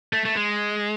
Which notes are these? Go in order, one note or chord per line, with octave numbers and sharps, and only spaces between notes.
A3
A3
G#3